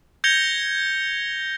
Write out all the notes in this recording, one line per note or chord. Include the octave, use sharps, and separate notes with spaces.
G6 G#6 A#6 C#7 F7 G7